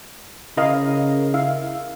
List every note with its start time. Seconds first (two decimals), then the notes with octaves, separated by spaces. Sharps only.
0.57 C#3 E4 A#4 D#5 F5
1.34 E4 F5